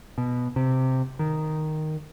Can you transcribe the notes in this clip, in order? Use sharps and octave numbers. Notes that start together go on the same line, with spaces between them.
B2
C3
D#3